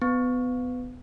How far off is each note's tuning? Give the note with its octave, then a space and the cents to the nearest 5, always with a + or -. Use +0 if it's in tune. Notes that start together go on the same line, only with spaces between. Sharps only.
B3 +25